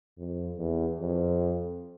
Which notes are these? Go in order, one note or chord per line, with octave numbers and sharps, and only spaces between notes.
F2
E2
F2